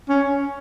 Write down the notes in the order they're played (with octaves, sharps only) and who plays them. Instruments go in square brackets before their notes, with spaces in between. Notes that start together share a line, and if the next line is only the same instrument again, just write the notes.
[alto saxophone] C#4